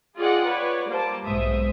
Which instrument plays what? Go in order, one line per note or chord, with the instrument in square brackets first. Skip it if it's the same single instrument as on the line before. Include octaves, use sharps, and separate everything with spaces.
[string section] F4 G#4 D5 D#5 F#5 G5
B4 C#5 D5
G3 A#3 C5 A5 D6
B1 G#2 C5 E5 D#6